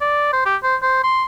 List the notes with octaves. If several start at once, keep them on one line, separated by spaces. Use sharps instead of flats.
D5
C5
G4
C5
C5
C6